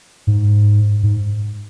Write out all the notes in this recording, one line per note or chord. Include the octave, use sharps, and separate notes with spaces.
G#2
G#2